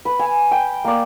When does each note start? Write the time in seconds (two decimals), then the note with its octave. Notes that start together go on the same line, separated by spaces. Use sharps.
0.05 B4
0.19 G#5
0.51 G5
0.85 A#3 D5